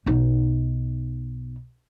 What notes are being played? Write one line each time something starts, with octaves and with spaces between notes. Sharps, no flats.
B1 D#4